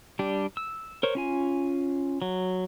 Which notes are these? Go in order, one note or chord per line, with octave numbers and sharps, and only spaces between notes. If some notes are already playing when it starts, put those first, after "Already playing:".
G3 D4 G4
E6
A#4 C5 C#5
C#4 F4 G#5
F#3